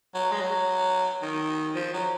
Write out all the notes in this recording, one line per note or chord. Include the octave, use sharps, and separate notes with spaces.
F#3
G#3
F#3
D#3
F3
F#3